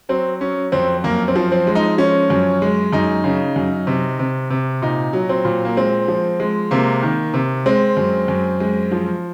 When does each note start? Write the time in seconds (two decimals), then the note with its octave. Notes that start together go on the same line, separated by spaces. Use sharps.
0.09 F#3 C4
0.41 F#3 C#4
0.72 F2 C4
1.04 F#2 A#3
1.28 C4
1.36 F3
1.52 C4
1.67 G#3
1.75 D#4
1.98 F3 C#4
2.30 F#2
2.62 G#3
2.93 F#2 D#4
3.24 C#3
3.56 F#2
3.87 C3
4.19 C3
4.50 C3
4.82 A#2 D#4
5.13 F#3
5.29 C4
5.45 A#2
5.65 A#3
5.77 G#3 C4
6.08 F3
6.40 G#3
6.71 C3 A#3
7.03 D#3
7.34 C3
7.66 G#3 C4
7.97 F#2
8.28 F#2
8.60 G#3
8.92 F3